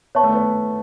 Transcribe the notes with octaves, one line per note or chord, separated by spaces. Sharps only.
B3 C#5 E5 A5 C#6
A3
B3